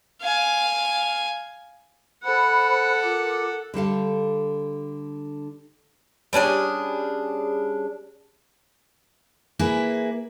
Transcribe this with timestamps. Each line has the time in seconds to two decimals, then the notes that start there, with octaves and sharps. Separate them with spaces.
0.22 F5 G#5
2.24 A4 C5 F#5 B5 F#6
3.03 F4 A#4 D6
3.74 D3 G3 A4 F5
6.33 G3 C#4 D4 G#4
9.59 A#3 E4 G#4 B4